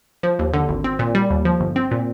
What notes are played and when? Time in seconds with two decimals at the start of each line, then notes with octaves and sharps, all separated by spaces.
0.23 F3
0.39 D#2
0.54 D3
0.69 G#1
0.84 C4
0.99 A#2
1.15 G3
1.30 D#2
1.45 F3
1.60 G1
1.76 C4
1.91 A#2